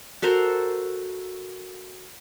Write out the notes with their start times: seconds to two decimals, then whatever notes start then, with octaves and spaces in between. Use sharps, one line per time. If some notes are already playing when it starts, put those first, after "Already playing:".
0.22 F#4 A4 A#4 C5